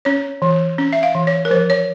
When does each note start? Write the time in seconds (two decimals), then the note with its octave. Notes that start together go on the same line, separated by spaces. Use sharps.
0.05 C#4 C#5
0.42 E3
0.78 C#4
0.93 E5
1.03 F5
1.15 E3
1.27 C#5
1.45 A#4
1.51 F3 C5
1.70 C#5